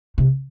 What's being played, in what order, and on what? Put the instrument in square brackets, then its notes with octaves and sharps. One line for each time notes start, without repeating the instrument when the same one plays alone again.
[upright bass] C3